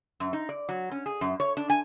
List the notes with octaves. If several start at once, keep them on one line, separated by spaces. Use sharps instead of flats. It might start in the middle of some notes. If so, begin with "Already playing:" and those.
F#2
D#4
D5
F#3
C#4
G#4
F#2
C#5
D4
G#5